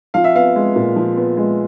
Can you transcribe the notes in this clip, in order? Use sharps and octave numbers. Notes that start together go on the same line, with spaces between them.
F3 F5
E5
B3 F5
G#3
A#2
F3
B3
G#3